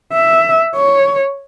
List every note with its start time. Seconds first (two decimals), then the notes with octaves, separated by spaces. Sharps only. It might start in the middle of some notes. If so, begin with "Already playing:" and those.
0.14 E5
0.76 C#5